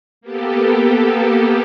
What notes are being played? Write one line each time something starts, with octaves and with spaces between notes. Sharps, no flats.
A#3 B3 G4 A4